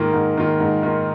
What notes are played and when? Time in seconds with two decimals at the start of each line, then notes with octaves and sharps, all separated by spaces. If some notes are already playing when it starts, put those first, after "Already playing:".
Already playing: G#2 D#3 A#3 F4
0.13 G#2
0.38 D#3 A#3 F4
0.60 G#2
0.83 D#3 A#3 F4